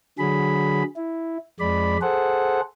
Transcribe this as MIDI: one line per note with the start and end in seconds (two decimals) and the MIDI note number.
0.19 0.83 50
0.19 0.83 54
0.19 0.83 68
0.19 0.83 83
0.96 1.38 64
1.60 1.97 41
1.60 1.97 56
1.60 1.97 74
1.60 1.97 83
2.01 2.61 68
2.01 2.61 69
2.01 2.61 72
2.01 2.61 78